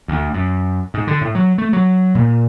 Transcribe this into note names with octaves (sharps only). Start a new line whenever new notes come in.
D2
F#2
G#2
D3
A2
F#3
A3
F#3
A#2